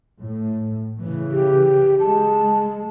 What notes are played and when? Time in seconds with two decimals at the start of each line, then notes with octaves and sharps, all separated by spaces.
0.19 A2
0.98 C#3 E3
1.32 G4
2.00 G#3 A5